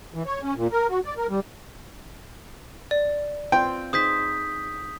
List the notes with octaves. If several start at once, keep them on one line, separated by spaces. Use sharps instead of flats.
E3
C#5
C#4
A#2
A#4
F#4
D5
A#4
G3
D5
C4 F4 G5
D#4 G#4 C5 D#6 G6 B6